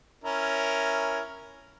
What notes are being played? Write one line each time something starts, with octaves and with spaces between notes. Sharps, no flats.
C#4 E4 A#4